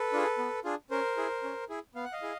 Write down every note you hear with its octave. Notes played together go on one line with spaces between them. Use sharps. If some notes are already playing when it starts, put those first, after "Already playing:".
Already playing: A4 B4
D4 F4 G#4
B3
D4 F4 G#4
C#4 A#4 C5
E4 G#4
C#4
E4 G#4
B3 F5
F#5
D#5 F5
E4 G#4